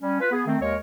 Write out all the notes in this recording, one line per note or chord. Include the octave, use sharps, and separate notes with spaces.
G3 C#4
F4 B4
B3 G#4
D#3 A3 C4
D#2 G#3 A#4 C#5